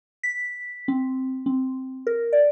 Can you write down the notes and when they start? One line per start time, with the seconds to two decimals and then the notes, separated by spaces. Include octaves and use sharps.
0.23 B6
0.88 C4
1.46 C4
2.07 A#4
2.33 D5